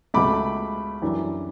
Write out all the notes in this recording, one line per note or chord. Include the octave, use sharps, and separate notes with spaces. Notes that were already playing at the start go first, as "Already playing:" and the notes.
C#2 B2 A3 B5 D6
F#2 E3 G3 D4